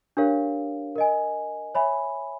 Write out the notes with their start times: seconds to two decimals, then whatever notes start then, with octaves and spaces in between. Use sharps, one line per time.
0.17 D4 G4 A#4 C#5 F5
0.96 A#4 D#5 G#5
1.75 C#5 E5 G#5 B5